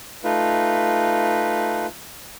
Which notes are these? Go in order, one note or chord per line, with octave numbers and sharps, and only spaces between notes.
A3 D#4 F4 B4